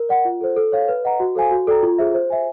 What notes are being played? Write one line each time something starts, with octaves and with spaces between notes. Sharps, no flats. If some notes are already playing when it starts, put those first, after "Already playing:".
Already playing: A#4
D5 F#5
F4
A4 C5
A4
C#5 F5
B4
D#5 F#5 A#5
F#4
A4 C5 F5 G#5
F#4
A4 D5 G5 A#5
F4
G#4 C5 E5
C5
E5 G#5